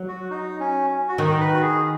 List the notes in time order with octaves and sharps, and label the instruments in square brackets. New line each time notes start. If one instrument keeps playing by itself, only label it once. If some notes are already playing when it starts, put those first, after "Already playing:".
Already playing: [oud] F#3
[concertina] F#4
D#4
C#4
F#4
[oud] D#3 [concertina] D#4
[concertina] B4
F#4
G#4